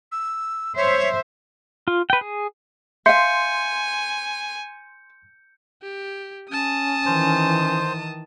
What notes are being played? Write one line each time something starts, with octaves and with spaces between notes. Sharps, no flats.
E6
C5 C#5 E5
F4
B4 G5
G#4
E5 F5 G#5 C6 G6 C#7
G4
C#4 A5 D#6
D#3 E3 C5